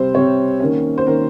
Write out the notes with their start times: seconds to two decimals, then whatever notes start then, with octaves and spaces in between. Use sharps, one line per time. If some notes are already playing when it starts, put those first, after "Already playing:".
Already playing: C3 G3 C4 C5
0.14 C3 G3 C4 C#5
0.60 D#3 A#3 C#4
0.98 C5
1.06 D#3 A#3 C#4 A#4